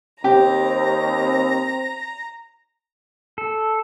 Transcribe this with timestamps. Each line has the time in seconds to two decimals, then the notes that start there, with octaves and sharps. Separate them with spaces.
0.24 D#2 C4 G4 A#5
3.38 A4